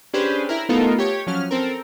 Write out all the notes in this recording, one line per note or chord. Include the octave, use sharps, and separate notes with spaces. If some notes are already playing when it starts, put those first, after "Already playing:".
C#4 D4 G4 G#4 B4 C5
E4 A#4
A3 B3 D#4 F4 A4 A#4
G4 C#5
F3 F#3 C#4 F6
C4 A4 A#4